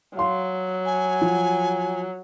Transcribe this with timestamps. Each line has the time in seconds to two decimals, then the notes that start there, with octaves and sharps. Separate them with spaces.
0.17 F#3 F5 C6
0.85 G#5
1.21 F3